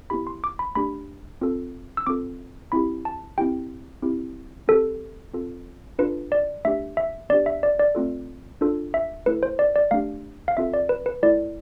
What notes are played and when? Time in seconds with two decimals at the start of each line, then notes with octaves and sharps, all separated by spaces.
0.10 B3 E4 G4 B5
0.27 C6
0.44 D6
0.59 B5
0.75 A3 D4 G4 B5
1.41 C4 F4 A4
1.97 E6
2.07 C4 F4 A4 D6
2.72 C4 E4 G4 B5
3.05 A5
3.38 C4 E4 G4 G5
4.02 C4 E4 G4
4.68 C4 G4 A4
5.34 C4 F4 A4
5.99 D4 F4 A4 B4
6.32 D5
6.65 A3 D4 G4 E5
6.97 E5
7.29 B3 D4 G4 D5
7.46 E5
7.63 D5
7.79 D5
7.95 A3 C4 F4 A4
8.61 D4 F4 A4
8.94 E5
9.26 A3 E4 A4 B4
9.43 C5
9.59 D5
9.76 D5
9.91 A3 D4 G4 F5
10.48 F5
10.57 C4 F4 A4 E5
10.74 D5
10.89 B4
11.06 B4
11.23 A3 E4 A4 D5